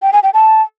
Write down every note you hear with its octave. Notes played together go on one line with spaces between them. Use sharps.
G5
G#5
G5
A5